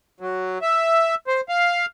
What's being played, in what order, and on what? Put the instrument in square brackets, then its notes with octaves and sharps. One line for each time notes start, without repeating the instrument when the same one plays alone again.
[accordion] F#3
E5
C5
F5